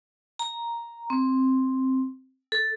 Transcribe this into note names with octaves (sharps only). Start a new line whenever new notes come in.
A#5
C4
A4